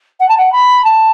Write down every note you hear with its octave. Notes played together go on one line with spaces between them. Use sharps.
F#5
A5
F#5
B5
A5